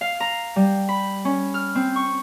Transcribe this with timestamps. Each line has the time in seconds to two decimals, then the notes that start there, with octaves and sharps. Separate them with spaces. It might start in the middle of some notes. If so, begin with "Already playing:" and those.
0.01 F5
0.20 A#5
0.56 G3
0.89 B5
1.25 C#4
1.54 F6
1.75 C4
1.96 C#6